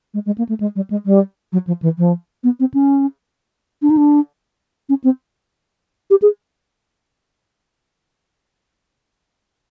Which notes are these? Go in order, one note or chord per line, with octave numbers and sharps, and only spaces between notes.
G#3
G#3
A#3
A3
G#3
G3
G#3
G3
F#3
F3
E3
F3
B3
C4
C#4
D4
D#4
D4
C#4
C4
G4
G#4